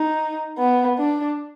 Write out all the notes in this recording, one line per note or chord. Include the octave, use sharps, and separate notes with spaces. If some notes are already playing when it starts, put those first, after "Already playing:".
Already playing: D#4
B3
D4